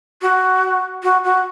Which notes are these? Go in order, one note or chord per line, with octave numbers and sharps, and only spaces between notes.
F#4
F#4
F#4